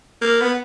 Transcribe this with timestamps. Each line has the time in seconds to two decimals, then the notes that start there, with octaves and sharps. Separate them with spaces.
0.21 A#3
0.41 B3